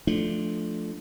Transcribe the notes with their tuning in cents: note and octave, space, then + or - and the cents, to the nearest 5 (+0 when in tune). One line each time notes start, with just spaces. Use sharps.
F3 +0 A3 -5 D4 +0